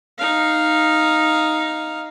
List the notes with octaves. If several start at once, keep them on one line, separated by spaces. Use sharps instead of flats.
D#4 F5